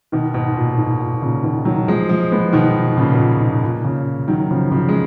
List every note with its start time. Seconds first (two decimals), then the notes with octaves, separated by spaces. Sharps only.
0.12 B2 D#3
0.34 G#2 B2
0.56 A#2
0.78 G#2
1.00 A#2
1.21 A#2 C#3
1.43 B2 D#3
1.65 D#3 F#3
1.88 F3 G#3
2.09 F3 G#3
2.32 G#3 B3
2.53 B2 D#3
2.97 A#2 C#3
3.14 B2
3.19 A#2
3.41 G#2
3.63 A#2
3.84 A#2 C#3
4.28 D#3 F#3
4.51 C#3 F3
4.71 C#3 F3
4.89 G#3